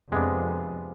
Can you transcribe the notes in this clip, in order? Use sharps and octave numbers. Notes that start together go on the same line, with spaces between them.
F2 C3 G#3 B3 D4